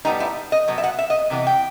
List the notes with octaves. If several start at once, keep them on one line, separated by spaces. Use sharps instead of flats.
A2 G3 B3 D#4
E4
D#5
B2 F#3 B3
E5
F#5
E5
D#5
C3 E3 B3
G5